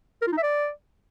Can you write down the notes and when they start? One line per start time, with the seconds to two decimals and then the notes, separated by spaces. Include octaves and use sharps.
0.22 A#4
0.27 F4
0.32 D#4
0.38 E5
0.43 D5